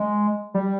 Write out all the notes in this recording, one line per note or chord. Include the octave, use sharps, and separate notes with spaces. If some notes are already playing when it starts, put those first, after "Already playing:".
Already playing: G#3
G3